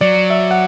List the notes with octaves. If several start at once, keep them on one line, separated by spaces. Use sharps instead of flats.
F#3 D5
E5
F#5